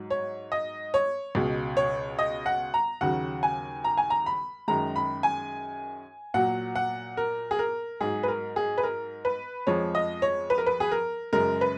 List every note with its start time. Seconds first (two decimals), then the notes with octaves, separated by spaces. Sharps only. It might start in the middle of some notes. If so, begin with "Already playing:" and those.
Already playing: G#2 F#3
0.10 C#5
0.52 D#5
0.94 C#5
1.35 C#2 B2 G#3
1.77 C#5
2.19 D#5
2.46 F#5
2.74 A#5
3.01 D#2 C#3 F#3 F#5
3.43 G#5
3.84 A#5
3.97 G#5
4.10 A#5
4.26 B5
4.68 F#2 D#3 G#3 A#5
4.96 B5
5.23 G#5
6.34 A#2 F#3 F#5
6.75 F#5
7.17 A#4
7.51 G#4
7.59 A#4
8.00 G#2 F#3 G#4
8.23 B4
8.28 A#4
8.56 G#4
8.78 B4
8.83 A#4
9.25 B4
9.67 F2 F3 G#3 C#5
9.95 D#5
10.22 C#5
10.50 B4
10.58 A#4
10.66 B4
10.80 G#4
10.92 A#4
11.33 F#2 C#3 G#3 A#4
11.61 B4